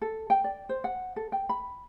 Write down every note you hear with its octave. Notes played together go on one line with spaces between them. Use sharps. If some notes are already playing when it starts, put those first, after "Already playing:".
A4
G5
D5
C5
F#5
A4
G5
B5